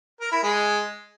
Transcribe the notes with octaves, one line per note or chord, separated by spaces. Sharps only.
A#4
E4
G#3